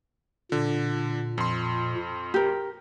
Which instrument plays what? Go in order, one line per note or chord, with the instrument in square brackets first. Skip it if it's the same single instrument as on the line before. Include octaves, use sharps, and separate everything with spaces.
[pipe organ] A#2 [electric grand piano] D3
[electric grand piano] F2 C6
[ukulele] G4 A#4